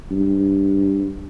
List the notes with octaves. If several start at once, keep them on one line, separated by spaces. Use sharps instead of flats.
G2